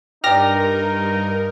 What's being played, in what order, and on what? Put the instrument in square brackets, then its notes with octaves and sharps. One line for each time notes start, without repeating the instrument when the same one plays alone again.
[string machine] G2 A#4 [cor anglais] D#4 [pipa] G4 D5 [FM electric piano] F6 A#6